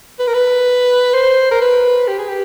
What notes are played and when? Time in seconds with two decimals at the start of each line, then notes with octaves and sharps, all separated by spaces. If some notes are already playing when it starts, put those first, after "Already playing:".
0.19 B4
0.27 A#4
0.34 B4
1.14 C5
1.51 A#4
1.61 B4
2.08 G4
2.18 G#4
2.29 G4